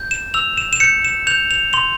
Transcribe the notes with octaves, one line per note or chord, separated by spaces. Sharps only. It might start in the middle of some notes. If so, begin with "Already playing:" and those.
Already playing: G6
E7
E6 F7
E7
E7
G6 C#7
E7
G6 F7
F7
C6 F7